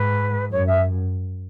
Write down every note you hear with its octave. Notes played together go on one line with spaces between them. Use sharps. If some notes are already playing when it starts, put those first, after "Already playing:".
Already playing: G#2 B4
F#2 C#5
E5